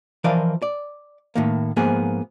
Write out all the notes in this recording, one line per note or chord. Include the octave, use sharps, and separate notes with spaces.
E3 F3 A#4 D5 D#5 F5
D5
A2 D#3 A#3
G#2 F3 A#3 B3 G#4